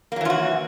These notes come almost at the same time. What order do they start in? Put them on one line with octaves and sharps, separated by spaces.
A#3 F#3 E3 F4 F#4